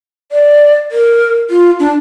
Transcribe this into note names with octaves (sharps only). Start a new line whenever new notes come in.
D5
A#4
F4
D4